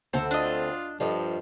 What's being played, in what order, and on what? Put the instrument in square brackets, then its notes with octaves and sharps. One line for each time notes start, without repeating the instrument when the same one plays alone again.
[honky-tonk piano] D2 [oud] C4 A4
[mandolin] D4 D#5 [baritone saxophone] F4
[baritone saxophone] G2 [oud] F3 [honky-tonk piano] A4 D5 D#5